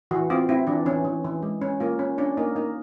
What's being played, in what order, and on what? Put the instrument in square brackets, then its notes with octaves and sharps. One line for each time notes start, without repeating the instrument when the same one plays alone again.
[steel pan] E3 F#4
C4 F4
C4 E4
E3 D4
E3 C#4
E3
E3
G#3
C#4
A#3 F4
C#4
C#4 D4
A#3 D#4
A#3 D#4